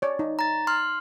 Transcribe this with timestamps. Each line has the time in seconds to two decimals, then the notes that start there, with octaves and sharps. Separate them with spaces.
0.02 C#5 D5
0.19 D#4
0.39 A#5 A6
0.67 C6 F6